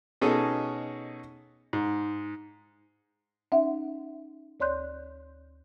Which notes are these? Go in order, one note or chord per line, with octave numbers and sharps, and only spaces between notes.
B2 C#4 D#4 G#4 A4 D#5
G#2
C#4 D#4 E5 F#5
D2 C#5 D5 C6 F#6 G6